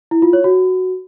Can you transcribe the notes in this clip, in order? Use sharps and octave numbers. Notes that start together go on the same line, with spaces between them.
E4
F4
C#5
F#4